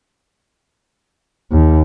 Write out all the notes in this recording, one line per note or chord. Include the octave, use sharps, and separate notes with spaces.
D#2